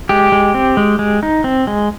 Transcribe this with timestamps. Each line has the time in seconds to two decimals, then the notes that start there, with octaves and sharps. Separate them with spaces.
0.09 G#3 G4
0.32 G#3
0.54 C4
0.77 G#3
0.99 G#3
1.23 D#4
1.44 C4
1.67 G#3